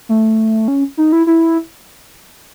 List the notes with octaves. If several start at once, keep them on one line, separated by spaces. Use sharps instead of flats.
A3
C#4
D#4
E4
E4